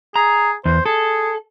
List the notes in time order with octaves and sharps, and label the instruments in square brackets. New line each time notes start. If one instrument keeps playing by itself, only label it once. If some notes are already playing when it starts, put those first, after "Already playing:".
[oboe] G#4 [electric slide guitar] A#5
[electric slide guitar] E2 [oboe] C5
[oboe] G#4 [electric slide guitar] A4